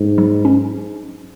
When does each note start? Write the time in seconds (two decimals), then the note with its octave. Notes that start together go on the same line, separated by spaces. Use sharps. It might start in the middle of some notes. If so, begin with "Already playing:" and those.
Already playing: G#2
0.18 F#3
0.45 C#4